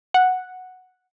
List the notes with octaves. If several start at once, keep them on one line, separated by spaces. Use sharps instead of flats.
F#5